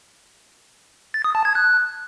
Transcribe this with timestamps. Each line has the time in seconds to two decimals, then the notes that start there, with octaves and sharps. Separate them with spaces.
1.14 A6
1.24 D#6
1.35 A5
1.45 G#6
1.55 F#6